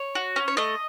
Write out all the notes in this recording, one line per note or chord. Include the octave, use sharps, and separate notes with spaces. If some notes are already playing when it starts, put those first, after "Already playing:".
Already playing: C#5
F#4
C#4
C#5
A3 D#5